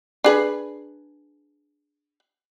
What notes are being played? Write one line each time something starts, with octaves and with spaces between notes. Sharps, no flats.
D4 G#4 B4